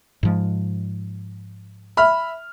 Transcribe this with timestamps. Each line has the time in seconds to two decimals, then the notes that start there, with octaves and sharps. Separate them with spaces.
0.23 G#2 F3 G#3
1.97 E5 B5 F6